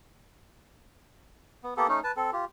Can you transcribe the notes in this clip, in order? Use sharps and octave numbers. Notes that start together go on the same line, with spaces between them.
B3
A#3 B3 G4 A4
A3 C#4 D#4
B4 A5
C4 A4
F4 G4